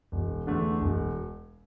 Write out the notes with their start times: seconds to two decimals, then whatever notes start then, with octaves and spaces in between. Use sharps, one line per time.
0.12 E1
0.47 E2 D3 A3
0.81 E1